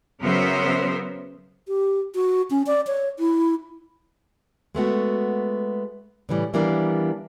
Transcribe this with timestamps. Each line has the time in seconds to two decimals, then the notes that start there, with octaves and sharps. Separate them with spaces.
0.21 C#3 F#3 B3 A#4 C5 E5
1.68 G4
2.15 F#4
2.51 C#4
2.67 D5
2.87 C#5
3.19 E4
4.75 G#3 A3 B3 F#4
6.29 A2 C#3 E3 G3
6.53 D#3 E3 G3 A#3 B3 D4